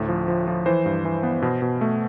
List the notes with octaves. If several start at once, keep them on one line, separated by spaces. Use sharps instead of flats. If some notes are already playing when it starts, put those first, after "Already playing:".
Already playing: D2 A2
F3
F3
F3
E3 C5
G2
E3
B3
B2
B2
A3